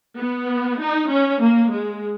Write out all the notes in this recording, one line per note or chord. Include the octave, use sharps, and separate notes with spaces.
B3
D#4
C#4
A#3
G#3